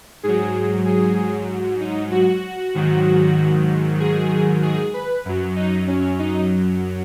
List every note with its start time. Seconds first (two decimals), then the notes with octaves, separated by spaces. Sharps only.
0.23 G#2 F#3 G#4
0.86 G#4
1.80 D#4
2.11 F#4
2.74 G#2 D#3 F#3
4.00 G#4
4.62 G#4
4.94 B4
5.25 F#2 F#3
5.56 D#4
5.88 C#4
6.19 D#4